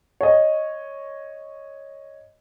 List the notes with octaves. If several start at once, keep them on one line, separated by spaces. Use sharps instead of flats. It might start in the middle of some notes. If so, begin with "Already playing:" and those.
C#5 D#5